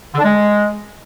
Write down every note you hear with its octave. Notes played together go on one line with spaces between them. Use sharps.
D3
D4
G#3